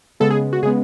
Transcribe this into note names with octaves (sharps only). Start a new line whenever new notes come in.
C#3 G#3 B3 A4
G#4
F#4
C#3 G#3 B3 G#4